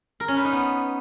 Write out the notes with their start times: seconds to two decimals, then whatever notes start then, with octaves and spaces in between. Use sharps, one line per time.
0.20 A#4
0.28 C#4
0.36 B4
0.45 D#4
0.53 B3